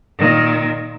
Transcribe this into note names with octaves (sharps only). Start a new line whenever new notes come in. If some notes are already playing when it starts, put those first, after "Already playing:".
A#2 D#3